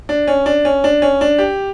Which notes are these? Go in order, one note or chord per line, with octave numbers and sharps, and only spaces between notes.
D4
C#4
D4
C#4
D4
C#4
D4
G4